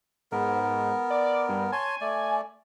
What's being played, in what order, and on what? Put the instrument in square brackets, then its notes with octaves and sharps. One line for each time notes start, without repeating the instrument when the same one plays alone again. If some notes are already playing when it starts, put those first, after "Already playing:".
[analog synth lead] G#2 [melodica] B3 A#4
[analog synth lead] D5
G2
[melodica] C#5 A5 C6 [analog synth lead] G#5
[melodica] A3 D5